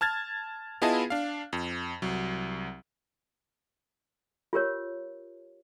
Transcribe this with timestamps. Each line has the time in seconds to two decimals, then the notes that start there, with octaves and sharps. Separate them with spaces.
0.01 A5 F6 G#6 A6
0.82 B3 E4 F4 G#4 D#5 A5
1.10 D4 F5
1.53 F2
2.02 C2 F#3
4.53 F4 G4 A#4 C#5